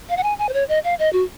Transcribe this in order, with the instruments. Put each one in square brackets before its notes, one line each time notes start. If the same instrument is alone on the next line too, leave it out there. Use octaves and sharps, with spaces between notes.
[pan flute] F5
F#5
G#5
G#5
C5
C#5
D#5
F5
D#5
F#4